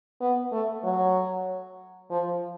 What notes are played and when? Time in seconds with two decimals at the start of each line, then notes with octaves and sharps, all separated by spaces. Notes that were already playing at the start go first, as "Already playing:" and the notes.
0.21 B3
0.52 A3
0.84 F#3
2.11 F3